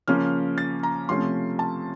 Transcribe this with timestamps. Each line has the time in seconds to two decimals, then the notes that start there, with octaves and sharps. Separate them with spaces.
0.08 C#3 F3 A#3 C#4 F6
0.58 A6
0.83 A#5
1.08 C3 F3 A3 C#4 C6
1.59 A5